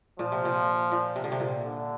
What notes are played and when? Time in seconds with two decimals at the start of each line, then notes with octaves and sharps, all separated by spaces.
0.19 A#2 F3
0.32 C3
0.45 A#2
0.92 A#2
1.16 C3
1.24 D3
1.32 C3
1.40 A#2
1.65 D3